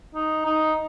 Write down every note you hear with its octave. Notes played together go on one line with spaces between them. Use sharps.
D#4
D#4